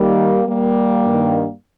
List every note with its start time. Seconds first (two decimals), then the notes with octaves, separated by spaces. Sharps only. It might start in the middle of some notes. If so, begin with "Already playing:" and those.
Already playing: D#2 D#3 G3 A#3
0.47 G3 A#3
1.05 G2 D#3